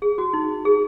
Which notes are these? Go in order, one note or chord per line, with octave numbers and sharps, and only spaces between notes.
G#4
F#4
D#4
G#4